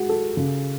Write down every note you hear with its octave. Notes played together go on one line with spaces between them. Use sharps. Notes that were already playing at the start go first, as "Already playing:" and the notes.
Already playing: G#3 F#4
A4
C#3